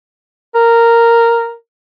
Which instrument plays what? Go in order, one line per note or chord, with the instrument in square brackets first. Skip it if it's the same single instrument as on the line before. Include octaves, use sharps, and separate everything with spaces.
[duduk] A#4